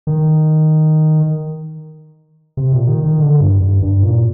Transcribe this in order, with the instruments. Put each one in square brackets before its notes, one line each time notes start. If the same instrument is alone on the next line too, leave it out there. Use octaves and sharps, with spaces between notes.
[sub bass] D#3
C3
A#2
D#3
D#3
D3
G2
G2
G2
A#2